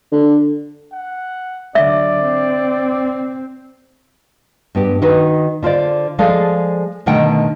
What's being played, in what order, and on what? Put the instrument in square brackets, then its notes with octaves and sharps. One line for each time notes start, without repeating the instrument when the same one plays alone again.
[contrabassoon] D3
[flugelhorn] F#5
[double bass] D3 F#3 [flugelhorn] D5 [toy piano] E5
[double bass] C4
[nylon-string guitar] G2 B3 G4
D#3 D#4 F#4 B4
D3 F4 C5 D5
F3 G#3 G#4 A4 D5 F5
B2 D3 D#3 A3 F#5 G5